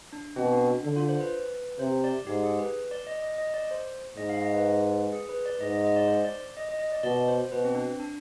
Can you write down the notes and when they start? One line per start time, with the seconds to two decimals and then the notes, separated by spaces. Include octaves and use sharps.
0.13 D4
0.36 B2 C4
0.53 D4
0.68 D4
0.84 D3 D4
0.96 F4
1.09 C5
1.21 B4
1.79 C3 C5
2.04 D5
2.27 G#2 G4
2.43 G#4
2.59 B4
2.91 D5
3.07 D#5
3.22 D#5
3.38 D#5
3.54 D5
3.71 C5
4.17 G#2 D#5
4.30 F5
4.42 D#5
4.54 B4
5.13 G#4
5.29 B4
5.46 D5
5.61 G#2 D#5
5.72 D#5
5.85 D#5
5.96 D5
6.08 C5
6.25 D5
6.57 D#5
6.69 D#5
6.79 D#5
6.92 D5
7.03 B2 D5
7.28 C5
7.51 B2 B4
7.65 C4
7.75 D4
8.00 D4